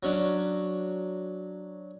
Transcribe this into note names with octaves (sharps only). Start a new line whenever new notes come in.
F#3 C#4 D4